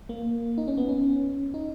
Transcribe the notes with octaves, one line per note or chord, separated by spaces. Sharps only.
A#3
D#4
C#4
B3
C#4
D#4